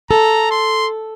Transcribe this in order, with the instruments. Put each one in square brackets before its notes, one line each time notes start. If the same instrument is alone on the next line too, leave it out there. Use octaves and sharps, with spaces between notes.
[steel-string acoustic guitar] A4 [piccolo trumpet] A#5
[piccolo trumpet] C6